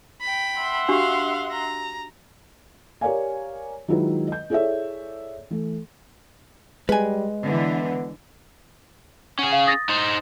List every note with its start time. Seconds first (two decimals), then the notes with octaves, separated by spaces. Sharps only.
0.21 G5 B5
0.59 E5 F#5 C6
0.89 D4 F#4 G4 F5
1.51 A#5
3.01 G4 A#4 C#5 D5 F5 G#5
3.88 D#3 F#3 G#3 E4 F4 B4
4.28 D#5 G6
4.50 E4 G#4 A4 C#5 D5 E5
5.50 E3 A3
6.89 G3 G#3 B4 G#5
7.43 D3 E3 B3
9.39 C#4 G#4 F#5
9.53 F5
9.67 D#6 A6 A#6
9.89 D#4 C5